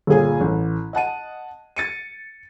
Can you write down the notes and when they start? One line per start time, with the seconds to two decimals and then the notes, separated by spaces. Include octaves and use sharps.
0.07 G1 A#2 G#4 G#5
0.41 A1
0.93 D#5 F#5 A5 D#7
1.76 A6 C#7 D#7